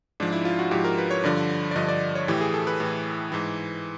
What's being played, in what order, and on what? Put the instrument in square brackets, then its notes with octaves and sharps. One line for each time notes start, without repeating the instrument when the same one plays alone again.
[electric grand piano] G#2 F3 D4
E4
F4
F#4
G#2 F3 G4
A#4
B4
C#5
G2 D3 F3 D5
D5
G2 D3 F3 D#5
D5
C#5
A2 E3 G4
G#4
A4
B4
A2 E3
G#2 E3